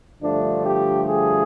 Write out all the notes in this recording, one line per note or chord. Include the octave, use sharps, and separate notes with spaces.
G2 D3 F3 A3 D4
G4
G#4